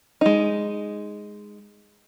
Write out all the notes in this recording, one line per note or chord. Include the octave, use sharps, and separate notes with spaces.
G#3 D#4